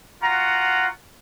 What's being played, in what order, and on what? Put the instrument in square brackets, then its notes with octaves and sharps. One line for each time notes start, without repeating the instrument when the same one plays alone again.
[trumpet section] F4 F#4 F#5 A#5